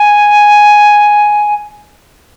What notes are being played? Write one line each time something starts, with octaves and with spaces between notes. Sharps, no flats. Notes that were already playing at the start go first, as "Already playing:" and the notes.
Already playing: G#5